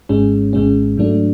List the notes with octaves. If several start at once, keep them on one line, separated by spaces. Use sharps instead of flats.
G#1 G#2 G#3 C#4
G#1 G#2 G#3 C#4
G#2 F#3 A3 D4